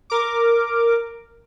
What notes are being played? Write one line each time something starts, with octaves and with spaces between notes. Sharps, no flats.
A#4 D6